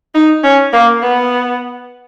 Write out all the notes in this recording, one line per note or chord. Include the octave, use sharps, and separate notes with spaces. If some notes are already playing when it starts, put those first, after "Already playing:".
D#4
C#4
A#3
B3